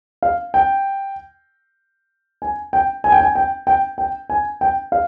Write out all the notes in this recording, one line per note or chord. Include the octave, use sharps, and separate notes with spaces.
F5
G5
G#5
G5
G#5
G5
G#5
G5
G5
G5
G#5
G5
F5